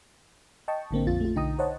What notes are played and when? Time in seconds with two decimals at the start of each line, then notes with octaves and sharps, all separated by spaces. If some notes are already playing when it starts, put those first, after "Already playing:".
0.68 D#5 G5 A5 C#6
0.91 A1 D3 A#3 C4
1.07 A#1 F2 F4 A6
1.20 A3 F4
1.35 B1 D3 D#4 G5 A#5 D#6
1.59 C5 C#5 D#5 F#5 A5